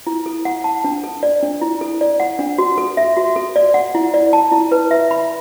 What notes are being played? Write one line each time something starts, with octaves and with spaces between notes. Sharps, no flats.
E4
A4
F#5
A5
D4
A4
D5
D4
E4
A4
D5
F#5
D4
F#4
A4
E5
F#4
A4
D5
F#5
E4
D5
A5
E4
B4
E5
B5